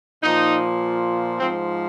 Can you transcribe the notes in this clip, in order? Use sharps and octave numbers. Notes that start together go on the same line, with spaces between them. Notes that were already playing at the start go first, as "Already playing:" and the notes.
A#2 F3 D#4
G#2 F3 C4